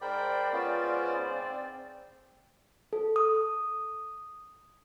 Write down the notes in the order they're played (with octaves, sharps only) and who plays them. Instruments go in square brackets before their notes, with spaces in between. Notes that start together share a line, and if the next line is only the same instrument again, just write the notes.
[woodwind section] G#2 C5 D5 [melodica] A#4 G5 B5
[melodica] B3 C#4 F4
C4
[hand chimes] A4
D#6